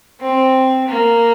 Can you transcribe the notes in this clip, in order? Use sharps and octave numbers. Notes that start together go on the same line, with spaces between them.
C4
A#3